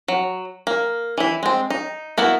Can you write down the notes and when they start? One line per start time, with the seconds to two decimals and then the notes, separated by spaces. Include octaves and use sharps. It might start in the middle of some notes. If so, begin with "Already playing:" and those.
0.08 F#3
0.67 A#3
1.18 E3 E4
1.43 G#3 C4
1.70 D#4
2.18 A#3 B3 E4 F#4